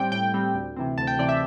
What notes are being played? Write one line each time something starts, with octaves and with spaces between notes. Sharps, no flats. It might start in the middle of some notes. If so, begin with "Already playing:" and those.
Already playing: A2 G3 C4 G5
A2 G5
G3 C4
D2
C3 E3 C4
D2 A5
G5
C3 E3 C4 D5
E5